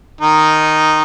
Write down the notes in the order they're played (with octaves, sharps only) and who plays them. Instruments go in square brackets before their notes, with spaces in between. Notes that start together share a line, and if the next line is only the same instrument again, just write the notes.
[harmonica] D#3 D#4